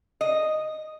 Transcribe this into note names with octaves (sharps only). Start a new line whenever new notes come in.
D#5